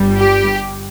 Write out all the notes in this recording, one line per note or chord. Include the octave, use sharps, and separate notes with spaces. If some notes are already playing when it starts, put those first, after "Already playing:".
Already playing: G1 G2 G3
G4